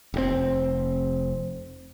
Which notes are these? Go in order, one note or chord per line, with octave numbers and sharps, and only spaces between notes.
F1 G#2 C4